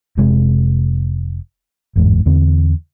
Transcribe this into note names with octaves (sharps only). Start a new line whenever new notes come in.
F1 C3 G#3
G1 E2 G#2
E2 D3 C4